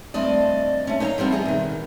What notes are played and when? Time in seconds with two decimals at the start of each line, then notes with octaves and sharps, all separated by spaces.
0.14 G2 F3 A3 C4 D5 D#5
0.87 A3 C#4
1.00 D#4 B4 C#5 E5 F5 A#5
1.18 F3 G3 B3 C4
1.31 E4 G#4 D#5
1.45 B2 D#3